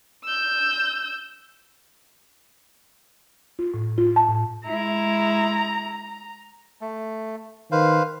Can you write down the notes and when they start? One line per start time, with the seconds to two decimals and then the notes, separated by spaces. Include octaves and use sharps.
0.24 E6 G6
3.59 F4
3.74 A2
3.98 F4
4.16 A5
4.29 A2
4.66 G#3 E4 A#5
6.81 A3
7.72 D#3 B4 C5 F5